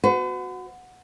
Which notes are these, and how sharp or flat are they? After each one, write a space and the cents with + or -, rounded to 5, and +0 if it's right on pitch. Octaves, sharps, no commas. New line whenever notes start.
F#4 -10 B4 +45